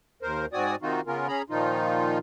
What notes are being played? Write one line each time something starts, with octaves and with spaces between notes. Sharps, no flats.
D#2 A#4 C5
G#2 C4 F#4 D5 G#5 D#6
C3 D#3 C4 D#4 F4 F#4
C#3 B3 C#4 F4 A#4
C#4 G#4 A#5 B5
A#2 D#3 F3 D#4 F4